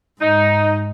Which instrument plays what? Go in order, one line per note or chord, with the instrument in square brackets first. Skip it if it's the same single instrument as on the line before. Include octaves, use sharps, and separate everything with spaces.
[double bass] G#2 [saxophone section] D#4